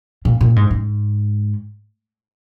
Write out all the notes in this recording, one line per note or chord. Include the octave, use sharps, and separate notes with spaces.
A#2
A#2
G#2
G#2